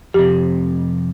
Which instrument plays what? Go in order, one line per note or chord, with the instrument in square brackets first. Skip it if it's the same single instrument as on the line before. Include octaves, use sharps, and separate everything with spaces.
[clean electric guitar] F2 C3 [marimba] G4